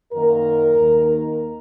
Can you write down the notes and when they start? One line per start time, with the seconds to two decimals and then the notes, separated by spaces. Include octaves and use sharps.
0.12 F#2 D#3 A#3 A#4
0.75 D#2 D#3 A#3
1.06 A#4